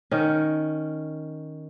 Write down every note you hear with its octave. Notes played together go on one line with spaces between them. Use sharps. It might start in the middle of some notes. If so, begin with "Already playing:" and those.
D#3 C#4